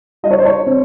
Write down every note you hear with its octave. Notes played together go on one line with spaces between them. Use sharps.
G3 D#5
C#5
C5
C#5
C4